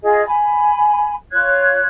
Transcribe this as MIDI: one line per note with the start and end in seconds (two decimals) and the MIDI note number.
0.03 0.23 65
0.03 0.23 68
0.03 0.23 75
0.26 1.12 80
0.26 1.12 83
1.31 1.86 65
1.31 1.86 73
1.31 1.86 90
1.31 1.86 92